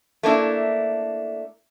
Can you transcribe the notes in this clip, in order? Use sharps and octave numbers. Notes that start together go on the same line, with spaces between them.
A3 A#3 D4 E4